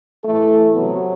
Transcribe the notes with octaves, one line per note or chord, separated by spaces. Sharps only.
A2 E3 A3 A4
C3 F#3 B3